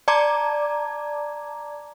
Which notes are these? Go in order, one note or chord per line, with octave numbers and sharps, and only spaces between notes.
D5 A5 A#5 D6 G#6